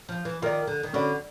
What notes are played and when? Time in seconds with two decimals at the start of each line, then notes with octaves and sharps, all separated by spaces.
0.09 F3
0.25 E3
0.42 D#3 F4 A#4 D5
0.67 D3
0.83 D#3
0.93 D3 C#4 F#4 B4 D5